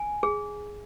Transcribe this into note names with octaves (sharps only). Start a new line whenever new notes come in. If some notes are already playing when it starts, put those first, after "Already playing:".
Already playing: G#5
G#4